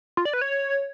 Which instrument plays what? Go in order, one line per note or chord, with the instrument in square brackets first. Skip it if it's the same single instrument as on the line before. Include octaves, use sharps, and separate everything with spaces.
[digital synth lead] F4
D5
B4
C#5